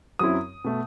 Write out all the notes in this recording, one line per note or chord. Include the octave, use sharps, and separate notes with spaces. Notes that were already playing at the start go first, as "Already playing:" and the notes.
F#2 F#3 C4 E4 D#6
B2 A3